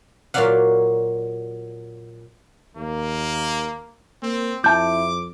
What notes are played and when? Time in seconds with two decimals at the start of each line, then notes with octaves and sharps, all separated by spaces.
0.34 A#2 F#3 F#4 D5 F5 F#5
2.76 D#2 A#3
4.22 A#3 C4
4.64 F2 E4 A5 D6 G6